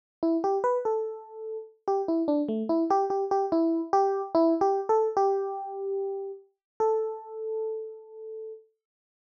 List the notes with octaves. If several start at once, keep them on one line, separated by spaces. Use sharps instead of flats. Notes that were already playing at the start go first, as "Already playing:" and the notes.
E4
G4
B4
A4
G4
E4
D4
A3
E4
G4
G4
G4
E4
G4
E4
G4
A4
G4
A4